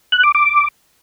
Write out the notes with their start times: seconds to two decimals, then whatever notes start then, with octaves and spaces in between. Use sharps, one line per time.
0.12 F#6
0.23 D6
0.35 D6